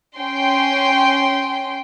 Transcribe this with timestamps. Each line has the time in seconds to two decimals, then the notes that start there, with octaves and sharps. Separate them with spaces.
0.18 C#4 G5 C6